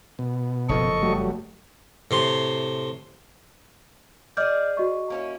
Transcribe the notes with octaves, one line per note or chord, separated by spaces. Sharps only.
B2
F#1 G2 F3 A4 D#5 C#6
F#3 G3 A3
A2 C3 C6
G#4 D5 D#5 F6 G6
F#4 D#5 C#6
A#3 C#4 E4